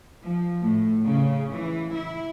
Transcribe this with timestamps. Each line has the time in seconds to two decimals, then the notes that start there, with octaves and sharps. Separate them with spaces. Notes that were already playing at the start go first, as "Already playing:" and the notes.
0.24 F3
0.61 A2
1.05 C#3
1.51 E3
1.93 E4